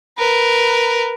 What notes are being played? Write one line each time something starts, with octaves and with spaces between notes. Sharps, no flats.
A#4 B4